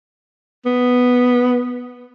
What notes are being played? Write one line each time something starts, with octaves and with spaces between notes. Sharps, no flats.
B3